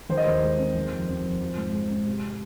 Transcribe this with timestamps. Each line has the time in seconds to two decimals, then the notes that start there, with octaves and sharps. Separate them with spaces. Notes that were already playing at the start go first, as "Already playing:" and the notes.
0.09 D#3 C5
0.17 D#5
0.25 D#2 C5
0.43 G#3
0.59 C4
0.75 D#3
0.92 F2
1.08 C4
1.24 F2
1.40 F3
1.57 G#2
1.73 G#3
1.90 C4
2.06 C3